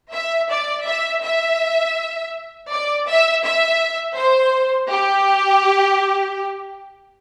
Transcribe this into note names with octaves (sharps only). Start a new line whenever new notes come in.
E5
D5
E5
E5
D5
E5
E5
C5
G4